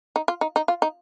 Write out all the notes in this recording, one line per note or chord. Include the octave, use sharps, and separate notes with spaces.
D#4
F4
D#4
D#4
F4
D#4